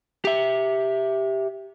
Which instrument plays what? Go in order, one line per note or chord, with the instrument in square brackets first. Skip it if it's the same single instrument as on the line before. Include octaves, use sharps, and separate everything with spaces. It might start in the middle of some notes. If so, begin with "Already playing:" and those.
[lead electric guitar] G4 E5